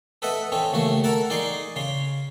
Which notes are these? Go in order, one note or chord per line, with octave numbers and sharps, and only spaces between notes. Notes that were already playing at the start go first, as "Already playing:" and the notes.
A4 B4 D#5 E5 F#5
C4 C#4 A4
D#2 C#3 A3 F#4 C#6
A4 A#4 F#5 A5
D#4 G#4 D5 C6 C#6
C#3 C#4 C6